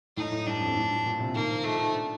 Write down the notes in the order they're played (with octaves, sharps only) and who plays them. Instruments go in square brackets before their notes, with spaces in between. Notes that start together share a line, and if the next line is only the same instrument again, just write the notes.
[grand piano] A2 [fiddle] D#4
[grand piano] A2
[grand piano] G2 [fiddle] D4
[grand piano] F2
A2
G2
A#2
C3
[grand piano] D#3 [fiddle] A#3
[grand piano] F3
[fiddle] A3 [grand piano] D#4
[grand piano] D#4
D4